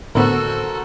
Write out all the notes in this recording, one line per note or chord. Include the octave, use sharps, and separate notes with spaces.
A2 D3 B3 F#4 A4 A#4 C5 E6